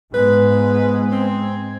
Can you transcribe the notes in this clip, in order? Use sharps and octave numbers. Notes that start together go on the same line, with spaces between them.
G#2 G#3 B3 B4
C4 G#6